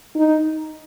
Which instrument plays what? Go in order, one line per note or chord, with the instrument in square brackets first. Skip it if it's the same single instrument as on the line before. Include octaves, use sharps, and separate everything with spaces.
[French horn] D#4